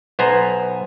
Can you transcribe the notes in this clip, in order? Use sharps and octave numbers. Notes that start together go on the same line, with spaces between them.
B1 B3 C5 G#5 A#5